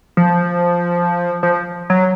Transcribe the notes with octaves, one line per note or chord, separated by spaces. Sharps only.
F3
F3
F#3